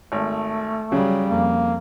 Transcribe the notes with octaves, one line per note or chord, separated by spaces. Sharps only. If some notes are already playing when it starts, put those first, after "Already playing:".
G#1 A3
C#3 F#3 G3
F2 A#3